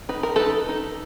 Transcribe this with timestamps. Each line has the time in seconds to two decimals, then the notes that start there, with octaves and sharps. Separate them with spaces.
0.09 D#4 B4
0.23 A#4
0.36 D#4 A4 B4
0.69 D#4